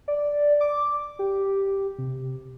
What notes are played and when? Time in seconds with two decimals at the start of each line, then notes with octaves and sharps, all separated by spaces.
0.08 D5
0.61 D6
1.19 G4
1.98 C3